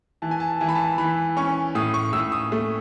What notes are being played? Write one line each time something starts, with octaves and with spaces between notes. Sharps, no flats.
E3 A5
G#5
A5
E3 A5
B5
A5
E3 B5
C#4 C#6
A2 D#6
C#6
A2 E6
D#6
A3